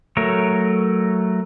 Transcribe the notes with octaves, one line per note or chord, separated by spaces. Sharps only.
F#3 A3 A#4 C#5